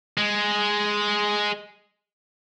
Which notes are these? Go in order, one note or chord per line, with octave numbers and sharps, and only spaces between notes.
G#3